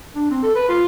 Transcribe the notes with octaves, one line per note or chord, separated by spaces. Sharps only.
D4
C4
A4
B4
F4